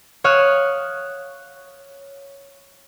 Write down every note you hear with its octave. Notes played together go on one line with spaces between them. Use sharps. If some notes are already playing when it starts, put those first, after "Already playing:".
C#5 F5 D#6 F#6 E7